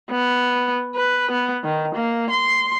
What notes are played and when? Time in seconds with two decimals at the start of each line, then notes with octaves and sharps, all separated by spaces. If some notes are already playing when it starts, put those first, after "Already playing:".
0.10 B3
0.96 B4
1.31 B3
1.64 D#3
1.95 A#3
2.30 C6